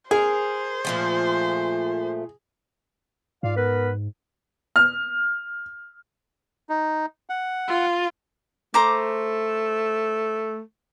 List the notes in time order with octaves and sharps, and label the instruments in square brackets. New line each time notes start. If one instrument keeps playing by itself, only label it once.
[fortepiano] G#4 [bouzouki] A#4 [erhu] C5
[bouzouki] A#2 F3 A3
[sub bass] G#2 [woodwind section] F4 D5 F5
[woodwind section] B3 A#4 B4
[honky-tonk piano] F6
[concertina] D#4
F#5
[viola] F4
[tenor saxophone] A3 [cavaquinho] C5 A#5 D6